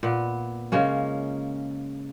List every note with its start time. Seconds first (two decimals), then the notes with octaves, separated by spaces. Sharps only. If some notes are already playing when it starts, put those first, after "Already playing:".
0.03 A#2 B3
0.72 C#3 G#3 A#3 C#4